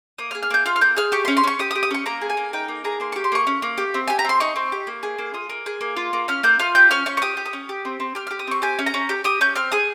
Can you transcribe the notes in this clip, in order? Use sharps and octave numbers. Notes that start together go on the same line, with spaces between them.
A#3 D#6
F6
G#4
F6
A#3 G6
F4 F6
F6
A#3 G6
G#4 F6
G4 C#6
C#4 C6
C6
C#4 C#6
G4 D#6
D#6
G4
D#6
C#4 C#6
A#3 A#5
G#4
G#5
A#3
D#4 G5
A#3
G#4 A#5
A#3 C6
G4 C#6
C6
A#3 C#6
C#4
A#3
G4
C4
G4 G#5
A#5
C4 C6
D#4 C#6
C4
G4
A#3
G#4
A#3
F4 D#6
A#3
G#4
A#3
F4
A#3
C#4 F6
A#3 G6
F4 F6
G4 G6
C#4 F6
C#4 C#6
C#6
G4 D#6
G4
D#6
C#4
G4
C4
C4
G4 F6
G4 F6
D#6
C4 C#6
G4 G#5
C#4
A#5
C#4
G4
G4 D#6
C#4 G6
C4 F6
G#4 D#6